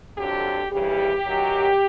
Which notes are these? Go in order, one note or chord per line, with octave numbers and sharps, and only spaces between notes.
F2 D3 F#3 G4
D2 C#3 E3 G3 G4
F#2 D#3 F#3